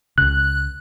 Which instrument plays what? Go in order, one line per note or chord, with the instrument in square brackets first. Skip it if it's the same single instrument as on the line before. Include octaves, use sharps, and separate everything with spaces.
[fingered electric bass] C#2 C#3 [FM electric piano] F#6